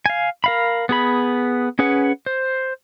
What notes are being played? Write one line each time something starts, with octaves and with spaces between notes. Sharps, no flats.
F5 G#5
A#4 F5 B5
B3 G#4 B5
C#4 G#4 B4 F#5
C5